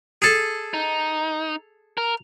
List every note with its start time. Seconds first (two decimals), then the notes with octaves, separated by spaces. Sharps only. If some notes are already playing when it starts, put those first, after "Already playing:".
0.22 G#4 A4
0.74 D#4
1.98 A#4